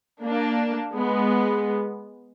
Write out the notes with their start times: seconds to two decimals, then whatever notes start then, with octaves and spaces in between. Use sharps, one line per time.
0.23 A#3 D4
0.94 G#3 B3